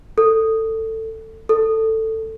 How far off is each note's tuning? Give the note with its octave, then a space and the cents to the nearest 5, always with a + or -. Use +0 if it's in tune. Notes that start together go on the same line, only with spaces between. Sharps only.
A4 +20
A4 +10